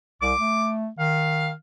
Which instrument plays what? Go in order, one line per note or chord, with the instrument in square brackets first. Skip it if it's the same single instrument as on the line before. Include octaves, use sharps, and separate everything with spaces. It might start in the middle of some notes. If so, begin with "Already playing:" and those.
[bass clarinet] C2 [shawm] D6
[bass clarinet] A3
[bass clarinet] D#3 [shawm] F5